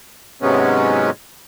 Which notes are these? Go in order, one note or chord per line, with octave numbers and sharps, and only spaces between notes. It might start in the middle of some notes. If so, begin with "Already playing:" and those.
G#2 C3 F#3 G#3 B3 C#4